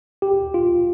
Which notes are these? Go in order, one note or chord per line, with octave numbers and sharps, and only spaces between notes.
G4
F4